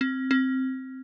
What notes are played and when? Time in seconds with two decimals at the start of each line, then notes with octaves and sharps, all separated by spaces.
0.01 C4
0.31 C4